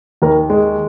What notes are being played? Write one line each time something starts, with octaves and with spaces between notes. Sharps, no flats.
D#2 A#4
G#3 G#4